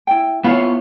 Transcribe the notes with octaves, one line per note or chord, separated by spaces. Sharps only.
E4 G5
B3 E4 F4 C5 C#5 F5